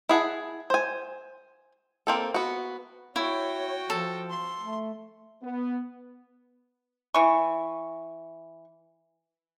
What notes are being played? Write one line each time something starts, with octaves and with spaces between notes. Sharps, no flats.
E4 G#4 F#5 A5
C5 G#5
A#3 C4 A4
B3 F#4
E4 F#4 C#5 G5
F3 A4
C6
A3
B3
E3 C#6